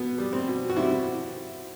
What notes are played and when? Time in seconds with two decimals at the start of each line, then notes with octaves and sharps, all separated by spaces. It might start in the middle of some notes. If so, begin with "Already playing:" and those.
Already playing: B2 B3
0.18 G3
0.33 C4
0.48 B2
0.69 F#4
0.76 G3 C4 E4